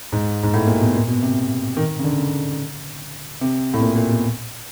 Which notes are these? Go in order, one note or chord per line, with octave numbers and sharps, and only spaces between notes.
G#2
G#2
A2
A#2
B2
A#2
B2
C3
D#3
C#3
D3
C#3
C3
A2
A#2
A#2
B2